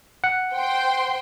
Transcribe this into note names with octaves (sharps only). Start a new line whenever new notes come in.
F#5
C5 G5 C6